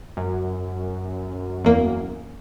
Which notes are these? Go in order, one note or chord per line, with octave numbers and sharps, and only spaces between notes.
F#2
E2 A#3